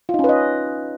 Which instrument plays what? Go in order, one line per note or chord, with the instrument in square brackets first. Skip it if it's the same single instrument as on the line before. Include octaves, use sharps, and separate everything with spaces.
[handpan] F4
D#4
C#4
B4
D#5